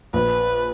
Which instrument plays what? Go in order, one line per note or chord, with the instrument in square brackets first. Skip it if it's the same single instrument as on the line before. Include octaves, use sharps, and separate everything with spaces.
[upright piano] A#1 [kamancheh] B4